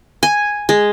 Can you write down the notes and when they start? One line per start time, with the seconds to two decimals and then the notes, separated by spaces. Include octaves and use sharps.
0.23 G#5
0.69 G#3